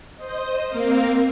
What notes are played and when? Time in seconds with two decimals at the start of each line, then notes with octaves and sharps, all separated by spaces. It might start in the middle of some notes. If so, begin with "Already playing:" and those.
0.17 C5 D#5
0.69 A#3 C4 A#4 F5